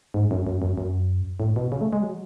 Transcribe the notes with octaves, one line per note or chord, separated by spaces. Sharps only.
G#2
F#2
F#2
F#2
F#2
A2
B2
C#3
A3
G#3
F#3